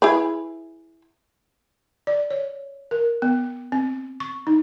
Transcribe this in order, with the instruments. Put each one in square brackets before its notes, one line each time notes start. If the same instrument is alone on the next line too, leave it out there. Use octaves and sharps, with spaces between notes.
[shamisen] E4 G#4 B4
[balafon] D5
C#5
A#4
B3
C4
C#6
D#4